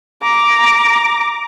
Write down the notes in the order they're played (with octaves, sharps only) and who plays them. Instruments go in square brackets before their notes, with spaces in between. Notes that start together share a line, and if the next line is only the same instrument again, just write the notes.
[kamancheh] A#5 D6